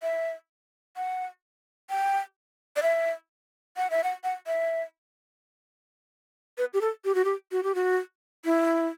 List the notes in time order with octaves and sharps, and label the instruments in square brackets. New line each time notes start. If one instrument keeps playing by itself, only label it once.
[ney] E5
F#5
G5
D5
E5
F#5
E5
F#5
F#5
E5
B4
G4
A4
G4
F#4
G4
F#4
G4
F#4
E4